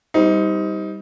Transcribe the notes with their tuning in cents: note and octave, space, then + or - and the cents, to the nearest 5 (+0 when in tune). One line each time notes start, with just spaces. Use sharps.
G3 +0 C4 -25 D#4 +25